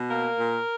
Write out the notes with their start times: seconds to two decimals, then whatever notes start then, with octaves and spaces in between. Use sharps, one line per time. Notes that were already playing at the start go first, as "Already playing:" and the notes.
Already playing: B2
0.10 A#3 A#4
0.37 A#2